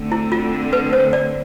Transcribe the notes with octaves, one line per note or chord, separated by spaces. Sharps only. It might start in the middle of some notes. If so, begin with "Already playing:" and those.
Already playing: D3 A3 C4
E4
F4
B4
C5
D5